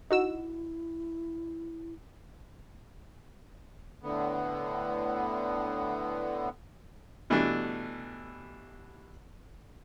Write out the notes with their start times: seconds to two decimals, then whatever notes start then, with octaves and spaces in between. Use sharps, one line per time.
0.11 D#4 E4 F#4 E6
4.03 A2 D3 B3
7.30 B2 E3 G3 A3 D4